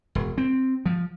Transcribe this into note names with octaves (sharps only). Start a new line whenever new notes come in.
E1
C4
F3